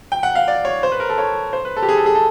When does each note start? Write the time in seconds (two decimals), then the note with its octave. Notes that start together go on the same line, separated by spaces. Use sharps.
0.12 G5
0.23 F#5
0.35 F5
0.48 D5
0.65 C#5
0.83 C5
0.92 B4
1.00 A#4
1.09 A4
1.18 C#5
1.53 C5
1.65 B4
1.76 A4
1.82 G4
1.89 G#4
1.97 A4
2.06 G#4
2.15 A4